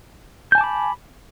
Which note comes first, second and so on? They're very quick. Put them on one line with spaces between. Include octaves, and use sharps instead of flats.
G6 G#5 A5 D6 B5